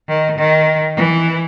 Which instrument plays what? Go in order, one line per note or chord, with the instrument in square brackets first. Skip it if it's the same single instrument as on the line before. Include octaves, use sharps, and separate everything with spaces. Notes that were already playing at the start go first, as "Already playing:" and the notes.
[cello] D#3
D#3
E3